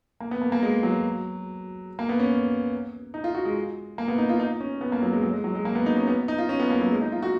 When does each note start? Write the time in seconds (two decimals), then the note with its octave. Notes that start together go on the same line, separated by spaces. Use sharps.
0.20 A#3
0.31 B3
0.42 A#3
0.52 A#3
0.63 G#3
0.83 F#3
1.99 A#3
2.09 B3
2.19 C#4
3.14 D#4
3.24 F4
3.35 F#4
3.45 G#3
3.98 A#3
4.08 B3
4.18 D#4
4.29 F4
4.40 D#4
4.61 C#4
4.81 B3
4.92 A#3
5.03 F#3
5.13 G#3
5.23 F#3
5.33 G#3
5.44 F#3
5.55 G#3
5.65 A#3
5.75 B3
5.86 D#4
5.96 C#4
6.07 B3
6.28 D#4
6.38 F4
6.49 C#4
6.59 B3
6.70 A#3
6.81 F#3
6.91 G#3
7.01 D#4
7.12 F4
7.22 F#4